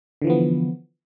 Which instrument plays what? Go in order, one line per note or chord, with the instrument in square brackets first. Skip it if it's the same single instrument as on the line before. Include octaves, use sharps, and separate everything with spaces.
[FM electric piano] D3
E3
F3
B3